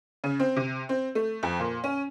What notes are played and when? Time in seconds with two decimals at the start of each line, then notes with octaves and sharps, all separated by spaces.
0.24 C#3
0.40 C4
0.56 C3
0.89 C4
1.15 A3
1.43 F2
1.60 A#2
1.84 C#4